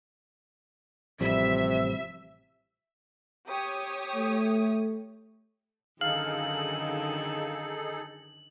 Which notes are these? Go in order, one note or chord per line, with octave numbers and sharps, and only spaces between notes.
A1 C3 F3 G3 E5
G4 C#5 D#6
A3
F#2 D3 D#3 D#4 G#4 A4 F5 F#7